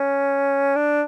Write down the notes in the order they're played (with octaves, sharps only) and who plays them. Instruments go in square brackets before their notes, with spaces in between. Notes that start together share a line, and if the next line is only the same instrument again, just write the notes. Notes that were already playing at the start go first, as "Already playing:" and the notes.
Already playing: [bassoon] C#4
D4